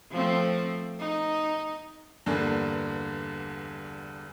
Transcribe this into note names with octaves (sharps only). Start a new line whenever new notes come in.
F3 A3 C4
D#4
E2 G2 D3 A#3 D4